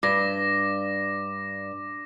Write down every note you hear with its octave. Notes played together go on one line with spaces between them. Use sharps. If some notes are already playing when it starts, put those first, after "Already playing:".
G2 D6 A#6